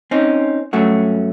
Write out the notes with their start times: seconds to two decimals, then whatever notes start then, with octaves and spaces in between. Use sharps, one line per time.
0.11 C4 C#4 D#4
0.73 G2 F#3 A3 C#4 F#4